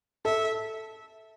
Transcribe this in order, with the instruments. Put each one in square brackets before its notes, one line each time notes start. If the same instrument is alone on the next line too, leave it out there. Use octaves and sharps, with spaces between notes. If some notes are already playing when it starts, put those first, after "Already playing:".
[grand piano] A4 [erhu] E5